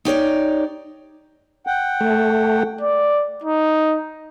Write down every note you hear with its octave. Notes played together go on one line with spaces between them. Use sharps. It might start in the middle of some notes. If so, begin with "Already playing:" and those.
D#4 G4 C#5 D5
F#5 G5
A3
D5
D#4